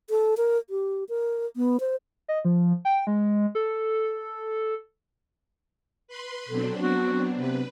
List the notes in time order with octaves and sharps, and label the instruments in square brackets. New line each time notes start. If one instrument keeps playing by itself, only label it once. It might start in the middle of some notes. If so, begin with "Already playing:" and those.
[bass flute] A4
A#4
G4
A#4
B3
C5
[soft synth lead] D#5
F3
G5
G#3
A4
[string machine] B4 B5 C6
[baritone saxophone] B2 [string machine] F#3 C4 D4 [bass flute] A4
[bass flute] B3 [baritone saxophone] F#4
[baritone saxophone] C3 [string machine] B4